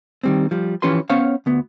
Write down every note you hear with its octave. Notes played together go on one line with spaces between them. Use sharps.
D#3 G3 C4
F3 G3
E3 F3 C#4 G4 B4 C6
B3 C#4 C5 C#5 F5
D2 B3